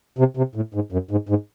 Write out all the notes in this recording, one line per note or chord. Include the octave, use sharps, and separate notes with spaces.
C3
C3
A2
G#2
F#2
G#2
G#2